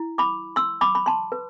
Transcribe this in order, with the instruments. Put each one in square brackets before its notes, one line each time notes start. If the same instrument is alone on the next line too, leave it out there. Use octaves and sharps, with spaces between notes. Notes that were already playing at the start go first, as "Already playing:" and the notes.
Already playing: [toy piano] E4
B5 D6
C6 E6
B5 D6
B5
A5 C6
B4